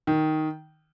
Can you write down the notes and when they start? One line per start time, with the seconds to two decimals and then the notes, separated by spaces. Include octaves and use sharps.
0.07 D#3